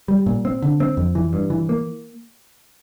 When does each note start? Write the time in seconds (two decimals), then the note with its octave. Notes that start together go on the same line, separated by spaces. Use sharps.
0.08 G3
0.26 A#2
0.45 C4
0.62 D3
0.80 C4
0.97 F2
1.15 E3
1.33 G2
1.50 E3
1.69 A#3